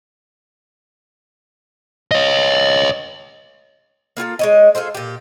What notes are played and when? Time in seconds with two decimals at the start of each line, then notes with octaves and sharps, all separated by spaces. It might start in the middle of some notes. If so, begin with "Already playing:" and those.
2.11 C#5 D#5
4.17 A#3 F4 G#4 A4
4.39 G#3 C#5 D#5
4.75 F4 G#4 A4 C5
4.95 A#2 G4